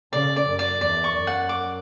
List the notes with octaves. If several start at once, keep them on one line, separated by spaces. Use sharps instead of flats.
C#3 D5
D5
F#2
D5
E2 D5
C#6
F#2
F#5
D6